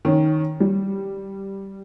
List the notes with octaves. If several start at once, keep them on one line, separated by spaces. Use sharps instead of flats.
D#3 C#4
G3